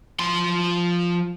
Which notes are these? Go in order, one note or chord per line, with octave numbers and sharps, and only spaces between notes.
F3 C6